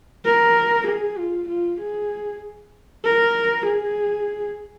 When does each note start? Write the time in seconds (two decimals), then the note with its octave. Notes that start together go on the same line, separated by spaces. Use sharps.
0.25 A#4
0.87 G#4
1.17 F4
1.48 F4
1.80 G#4
3.04 A#4
3.66 G#4